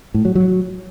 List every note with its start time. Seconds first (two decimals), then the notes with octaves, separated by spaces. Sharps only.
0.14 A2
0.25 F#3
0.35 F#3